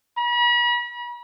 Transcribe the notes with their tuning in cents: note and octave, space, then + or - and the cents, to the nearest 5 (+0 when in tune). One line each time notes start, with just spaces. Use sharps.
B5 -40